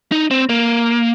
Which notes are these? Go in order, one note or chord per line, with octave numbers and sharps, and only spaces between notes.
D#4
C4
A#3